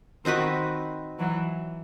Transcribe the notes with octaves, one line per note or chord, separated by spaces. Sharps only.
D#3 C4 D#4 F#4 B4
E3 F#3